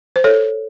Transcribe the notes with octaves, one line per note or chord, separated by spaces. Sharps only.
C5
A4 C#5